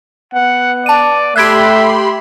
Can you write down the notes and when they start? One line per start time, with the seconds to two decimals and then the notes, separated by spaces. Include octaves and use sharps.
0.34 B3 F#5
0.86 D5 A5 D#7
1.36 A3 G4 E5 B5 C6 F#6 G#6 D7